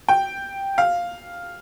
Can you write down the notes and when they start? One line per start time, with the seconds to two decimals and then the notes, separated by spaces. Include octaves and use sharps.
0.09 G5
0.78 F5